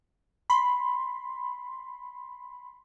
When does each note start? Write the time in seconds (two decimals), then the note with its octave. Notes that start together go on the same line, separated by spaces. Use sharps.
0.50 B5 C6